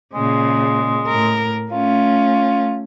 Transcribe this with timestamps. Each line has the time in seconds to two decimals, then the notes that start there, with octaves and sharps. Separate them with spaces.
0.14 A#2 C#3 G#3
1.08 A2 A#4
1.72 A3 C#4 F4